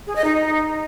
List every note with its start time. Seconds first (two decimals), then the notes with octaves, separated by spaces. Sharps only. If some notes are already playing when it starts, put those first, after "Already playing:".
0.07 G#4
0.16 D#5
0.24 D#4